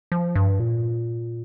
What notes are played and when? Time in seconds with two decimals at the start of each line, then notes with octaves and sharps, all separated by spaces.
0.12 F3
0.35 G2
0.60 A#2